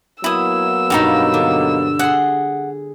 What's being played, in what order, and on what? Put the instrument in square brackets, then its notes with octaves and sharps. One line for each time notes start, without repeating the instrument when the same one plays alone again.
[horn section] F#3 A#3 B3 [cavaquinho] E4 D#6 [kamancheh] E6
[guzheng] G2 B2 [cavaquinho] D#4 F#4 F5
[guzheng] D3
[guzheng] G#4 C6 [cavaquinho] F#5